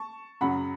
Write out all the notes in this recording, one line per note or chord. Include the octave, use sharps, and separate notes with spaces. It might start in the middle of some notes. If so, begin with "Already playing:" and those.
Already playing: A5 C#6
F#2 C#3 F#3 F#5 B5